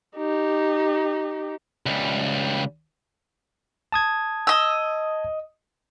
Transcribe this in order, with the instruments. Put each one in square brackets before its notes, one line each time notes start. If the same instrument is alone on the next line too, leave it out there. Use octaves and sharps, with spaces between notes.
[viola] D#4 G4
[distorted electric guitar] C#2 G3
[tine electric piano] A5 D#6 G#6
[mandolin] D#5 E6